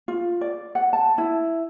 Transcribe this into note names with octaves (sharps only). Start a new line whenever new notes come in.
F4
D5
F#5
A5
E4